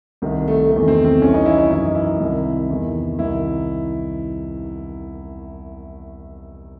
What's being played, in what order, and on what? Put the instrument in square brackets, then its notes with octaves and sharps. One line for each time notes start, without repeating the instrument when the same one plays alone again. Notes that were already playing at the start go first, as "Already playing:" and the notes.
[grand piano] C2 C3 D#3
A3
E2 C3 D#3 A3
C4
C4
C2 C3 E3 C#4
D#4
E4
D#4
F#2 E3 D#4
E4
C2 C3 D#3
E2 C3 D#3
C2 C3 D#3 E4